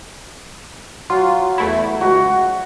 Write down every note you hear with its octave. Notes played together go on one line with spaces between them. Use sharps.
F#3 F4
E2 A3 E4
C#2 F#4